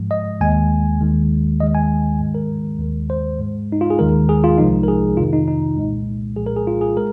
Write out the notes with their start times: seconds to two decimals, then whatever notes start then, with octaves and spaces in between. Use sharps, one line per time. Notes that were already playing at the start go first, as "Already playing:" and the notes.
Already playing: G#2 F3 G#3
0.11 D#5
0.41 D#2 D#3 G#3 G#5
1.01 D#2 D#3 G#3
1.60 D#2 D#3 G#3 D#5
1.75 G#5
2.20 G#2 D#3 G#3
2.35 A#4
2.79 D#2 D#3 G#3
3.10 C5
3.39 G#2 G#3
3.72 D#4
3.81 F4
3.90 G#4
3.99 D#2 D#3 G#3 A#4
4.29 G#4
4.44 F4
4.58 C2 C3 F3 G#3 D#4
4.83 A#4
4.88 G#4
5.17 F2 C3 D#3 F4
5.33 D#4
5.48 D#4
5.77 C2 A#2 G#3
6.36 C2 A#2 F3 G#3 G#4
6.46 A#4
6.56 G#4
6.67 F4
6.81 G#4
6.97 G#3 A#4